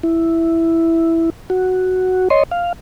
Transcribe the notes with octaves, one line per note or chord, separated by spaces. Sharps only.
E4
F#4
C#5 D#5 C6
F5